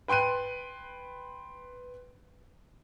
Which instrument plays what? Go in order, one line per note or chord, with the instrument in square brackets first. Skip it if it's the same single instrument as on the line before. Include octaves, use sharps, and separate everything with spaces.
[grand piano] B4 G5 C6 F#6 D#7